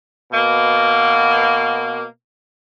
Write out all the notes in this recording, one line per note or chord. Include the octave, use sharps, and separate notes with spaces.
B2 A#3